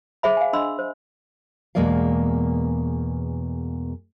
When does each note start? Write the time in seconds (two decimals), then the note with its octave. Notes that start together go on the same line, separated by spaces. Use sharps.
0.23 G#4 C5 E5 B5
0.37 F5 G#5
0.53 D4 D#5 B5 C6 E6
0.79 C5
1.75 E2 B2 G#3 A#3 D5 F5